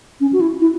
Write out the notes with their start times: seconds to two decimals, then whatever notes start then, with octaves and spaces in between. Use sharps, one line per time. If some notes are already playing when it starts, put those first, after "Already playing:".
0.21 C#4
0.33 F#4
0.41 E4
0.61 E4